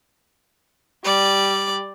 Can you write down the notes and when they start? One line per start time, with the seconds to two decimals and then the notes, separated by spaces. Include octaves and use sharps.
1.05 G3 D5